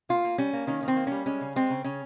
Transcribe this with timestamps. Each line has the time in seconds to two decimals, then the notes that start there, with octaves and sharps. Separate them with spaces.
0.09 A#3 F4
0.24 A#3
0.38 G3 C#4
0.53 A#3
0.67 D#3 C#4
0.83 D#3
0.88 C4
0.96 A#3
1.07 G3 C#4
1.26 G#3 C#4
1.41 C#3
1.56 G#3 C4
1.70 C#3
1.84 C#3 C#4